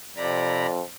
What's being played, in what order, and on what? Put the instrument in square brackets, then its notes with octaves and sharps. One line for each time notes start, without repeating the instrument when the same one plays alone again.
[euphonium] F2 [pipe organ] C3 A#5 B5 [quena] D5